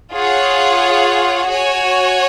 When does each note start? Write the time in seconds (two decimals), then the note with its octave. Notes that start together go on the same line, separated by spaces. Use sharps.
0.12 F4 G#4 C#5 F#5
1.48 F#4 C#5 G#5